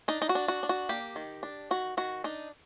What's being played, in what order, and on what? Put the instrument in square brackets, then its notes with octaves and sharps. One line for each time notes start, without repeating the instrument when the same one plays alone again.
[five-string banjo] D4 D#4
D#4
F#4
D4
F#4
D4
F#4
A#3 G4
D#3
D4
D#3 F#4
D#3 F#4
D4 D#4